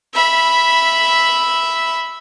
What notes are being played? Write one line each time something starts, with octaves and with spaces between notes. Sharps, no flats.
E5 B5